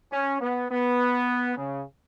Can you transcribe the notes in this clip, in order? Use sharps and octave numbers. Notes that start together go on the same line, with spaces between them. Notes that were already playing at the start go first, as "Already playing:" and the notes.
C#4
B3
B3
C#3